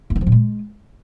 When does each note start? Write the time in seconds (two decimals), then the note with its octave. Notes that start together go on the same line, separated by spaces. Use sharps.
0.10 A#3
0.16 D3
0.21 F3
0.27 A#2
0.32 G#3